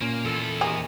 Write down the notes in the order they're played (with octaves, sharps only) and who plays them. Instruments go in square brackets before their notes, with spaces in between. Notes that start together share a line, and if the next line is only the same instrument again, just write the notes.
[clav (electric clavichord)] A#2 C#4 [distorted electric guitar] A#3
[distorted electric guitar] E2 E4 [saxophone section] F4 A4
[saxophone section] D#2 C3 D#3 [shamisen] G#4